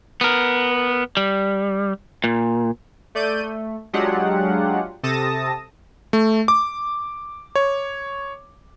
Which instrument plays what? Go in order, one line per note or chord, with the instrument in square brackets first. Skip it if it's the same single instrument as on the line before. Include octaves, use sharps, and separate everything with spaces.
[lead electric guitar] B3 A#4
G3
A#2
[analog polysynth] A3 D5 G6 D#7
A3
F#3 G#3 D4 F4 G4 F#5
C3 A4 A5 D#6 A#6
[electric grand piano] A3
D6
C#5